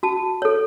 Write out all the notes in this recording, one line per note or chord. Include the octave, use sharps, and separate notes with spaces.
F#4 A5
A4 C#5